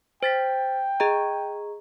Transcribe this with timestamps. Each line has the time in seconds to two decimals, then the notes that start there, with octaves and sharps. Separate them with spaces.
0.23 C5 G5 A6 B6
1.00 G#4 D#5 A#5